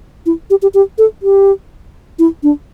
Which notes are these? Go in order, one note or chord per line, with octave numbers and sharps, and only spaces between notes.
E4
G4
G4
G4
A4
G4
E4
D4